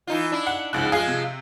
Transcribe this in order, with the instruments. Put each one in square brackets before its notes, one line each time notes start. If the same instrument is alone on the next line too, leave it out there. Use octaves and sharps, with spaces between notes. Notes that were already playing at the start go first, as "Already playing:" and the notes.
[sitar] E3 D#4 F4
D4 E4
[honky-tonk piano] F#5
[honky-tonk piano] C#2 F#6 [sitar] G#2 F3
[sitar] F3 G#3 F4 [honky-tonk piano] G#4 F5
[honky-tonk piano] C3